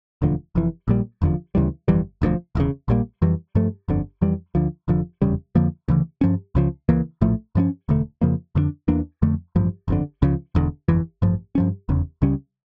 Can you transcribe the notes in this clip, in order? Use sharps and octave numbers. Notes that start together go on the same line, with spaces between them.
E1 D2 D3 F3
F1 F2 E3
A#1 A#2 G3
F1 E2 D3 F3
D2 C#3 E3 G3
G1 F2 E3 G3
E1 D2 C#3 F3
E1 E2 C#3
A#1 A#2 G3 A#3
F2 E3 G3
G2 F3 A3
G1 F2 D3
F2 E3 G3
D2 D3 F3
F1 F2 D3 F3
F1 E2 C#3 G3
F2 D3 F3 A#3
D2 C#3 E3
G2 F3 C#4
C#2 C#3 F3
C#2 C#3 E3 A#3
A#1 A2 F3 A3
G2 F3 A#3 C#4
E1 D2 D3 A3
F2 C#3 F3 A#3
F2 D3 A3 D4
E2 E3 A#3 D4
F2 D3 A3
A1 G2 F3
G1 F2 D3
C#2 C#3 F3
E1 E2 D3
G1 F2 E3
A1 G2 F3
G2 F3 C#4
F1 E2 C#3
C#2 C#3 G3 C#4